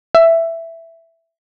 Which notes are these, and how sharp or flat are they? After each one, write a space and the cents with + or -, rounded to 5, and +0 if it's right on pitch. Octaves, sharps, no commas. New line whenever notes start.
E5 +5